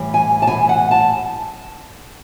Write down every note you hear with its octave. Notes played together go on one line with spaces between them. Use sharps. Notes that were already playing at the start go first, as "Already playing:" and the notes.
Already playing: A2 E3 G3
G#5
A5
A2 E3 G3 G#5
F#5
A5